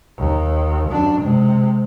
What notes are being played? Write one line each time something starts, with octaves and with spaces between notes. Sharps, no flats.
D#2
F#2 D4
C3 G#3